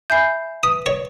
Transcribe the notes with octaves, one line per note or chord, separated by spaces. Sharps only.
E5 G#5 B5 G6 C7
B4 D#6
C#5